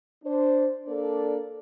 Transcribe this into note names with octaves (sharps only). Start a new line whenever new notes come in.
D4 C5
A#3 D4 A4 D5